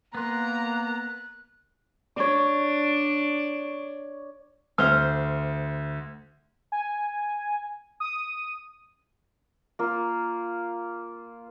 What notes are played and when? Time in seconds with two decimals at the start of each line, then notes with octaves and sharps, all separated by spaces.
0.15 A#3 B3 A#5 C6 F#6
2.16 D4 C#5 D5
4.78 D2 C5 F6
6.72 G#5
8.00 D#6
9.79 A#3 F4